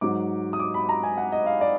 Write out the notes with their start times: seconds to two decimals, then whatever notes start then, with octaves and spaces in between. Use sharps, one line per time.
0.01 G#2 F#3 D6
0.53 D#6
0.60 D6
0.74 B5
0.89 A#5
1.03 G#5
1.18 F#5
1.32 D#5
1.46 F5
1.61 D5